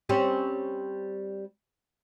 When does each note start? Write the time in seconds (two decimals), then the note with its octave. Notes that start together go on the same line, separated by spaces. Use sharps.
0.09 G3 C4 C#4